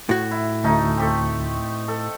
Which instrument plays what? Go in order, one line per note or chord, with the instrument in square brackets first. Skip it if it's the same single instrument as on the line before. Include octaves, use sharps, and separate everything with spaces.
[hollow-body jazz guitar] A2 F#4
[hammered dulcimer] E4
[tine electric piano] D2 [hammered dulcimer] A3 C#4 D#4
[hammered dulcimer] C4 G4 A4
A4